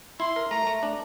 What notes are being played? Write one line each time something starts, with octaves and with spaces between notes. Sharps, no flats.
E4 C6
A#4
A3 A#5
A3
D4